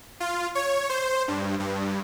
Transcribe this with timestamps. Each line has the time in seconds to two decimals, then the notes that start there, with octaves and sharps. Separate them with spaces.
0.20 F4
0.55 C#5
0.90 C5
1.28 G2
1.60 G2